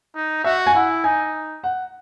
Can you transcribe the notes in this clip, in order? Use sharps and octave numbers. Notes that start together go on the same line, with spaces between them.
D#4
F#4 E5
G#5
E4 F#5
D#4 G#5
F#5